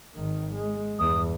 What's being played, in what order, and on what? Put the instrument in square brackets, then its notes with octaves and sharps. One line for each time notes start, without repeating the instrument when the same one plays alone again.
[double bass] G#1 D#3
G#3
[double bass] E2 G2 [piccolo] D#6